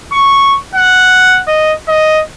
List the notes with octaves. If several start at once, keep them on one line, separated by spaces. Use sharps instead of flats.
C#6
F#5
D#5
D#5